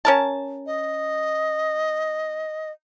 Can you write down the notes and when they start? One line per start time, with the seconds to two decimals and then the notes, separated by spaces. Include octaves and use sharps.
0.05 C#4 A#4 A5
0.66 D#5